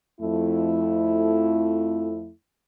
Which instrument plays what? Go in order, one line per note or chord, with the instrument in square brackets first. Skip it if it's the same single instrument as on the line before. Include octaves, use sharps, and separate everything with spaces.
[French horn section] F2 A3 E4